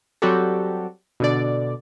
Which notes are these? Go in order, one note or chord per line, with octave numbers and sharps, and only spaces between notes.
F#3 G3 C4 F#4 G4 A4
B2 D3 D5